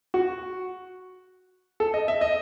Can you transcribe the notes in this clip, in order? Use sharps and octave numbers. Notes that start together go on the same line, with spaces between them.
F#4
A4
D#5
E5
D#5